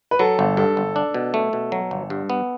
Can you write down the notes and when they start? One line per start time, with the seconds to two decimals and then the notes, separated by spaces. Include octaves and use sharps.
0.11 B4
0.19 F#3 A4
0.39 G1
0.57 G2 A4
0.77 G1
0.96 D4
1.14 B2
1.34 A3
1.53 B2
1.72 F#3
1.91 G1
2.10 G2
2.30 B3